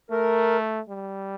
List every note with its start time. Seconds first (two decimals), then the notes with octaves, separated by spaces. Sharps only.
0.11 A3 A#4
0.88 G3